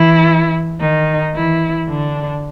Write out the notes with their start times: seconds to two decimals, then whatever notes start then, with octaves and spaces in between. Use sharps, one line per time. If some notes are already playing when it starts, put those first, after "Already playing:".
Already playing: E3 E4
0.80 D#3 D#4
1.34 E3 E4
1.89 D3 D4